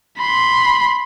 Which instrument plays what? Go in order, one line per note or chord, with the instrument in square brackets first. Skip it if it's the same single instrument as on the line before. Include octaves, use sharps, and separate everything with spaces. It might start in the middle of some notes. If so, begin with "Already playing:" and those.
[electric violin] B5 C6